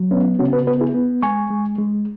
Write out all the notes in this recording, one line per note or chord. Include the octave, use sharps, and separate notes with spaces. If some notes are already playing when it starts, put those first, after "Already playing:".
Already playing: F#3
B3 C#4
C#3 C#4 F#4
F#4 B4
B3 F#4 B4
E4 G#4
B3
G#3 G#5 C#6
G#3
G#3